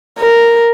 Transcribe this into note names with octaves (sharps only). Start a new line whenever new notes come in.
A#4